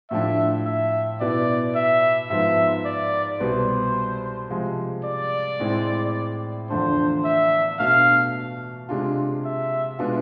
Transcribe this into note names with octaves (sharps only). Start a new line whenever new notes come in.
A2 F3 A3 D4 E5
E5
B2 B3 E4 D5
E5
G#2 F3 B3 E5
D5
C2 B2 B3 C5
C3 F3 G#3
D5
A2 G#3 C4 E4
E2 D3 F3 A3 D4 C5
E5
B2 A3 D4 F5
C3 G#3 D4 F4
E5
B2 G#3 B3 D4 F4